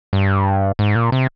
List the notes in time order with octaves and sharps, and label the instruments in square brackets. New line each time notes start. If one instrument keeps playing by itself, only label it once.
[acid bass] G2
G#2
A#2
C3